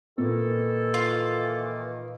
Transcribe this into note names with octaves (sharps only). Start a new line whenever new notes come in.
A#2 D#3 E3 A#3 A4
F4